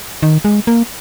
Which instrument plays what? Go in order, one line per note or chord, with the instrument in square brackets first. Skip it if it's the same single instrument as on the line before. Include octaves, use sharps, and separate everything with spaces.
[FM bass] D#3
G#3
A#3